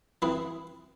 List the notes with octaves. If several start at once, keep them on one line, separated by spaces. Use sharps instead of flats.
E3 C4 E4 G#4 B4